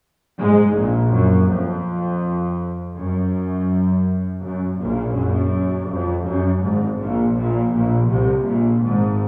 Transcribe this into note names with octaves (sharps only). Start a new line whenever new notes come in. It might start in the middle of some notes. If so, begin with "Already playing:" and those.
G#2 G#3
A#1 A#2
F#2
F2
F#2
F#2
A#1 A#2
F#2
F2
F#2
G#1 G#2
A#1 A#2
A#1 A#2
A#1 A#2
C2 C3
A#1 A#2
G#1 G#2